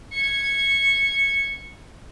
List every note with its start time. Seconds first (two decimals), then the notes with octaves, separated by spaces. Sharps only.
0.12 G#6 C#7